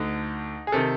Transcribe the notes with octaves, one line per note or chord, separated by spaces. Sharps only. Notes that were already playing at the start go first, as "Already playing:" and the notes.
Already playing: D2 D3 D#4
G#4
C3 D#3 A4